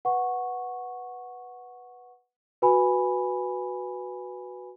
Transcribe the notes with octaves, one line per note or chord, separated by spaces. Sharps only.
B4 F#5 C#6
F#4 B4 G#5 B5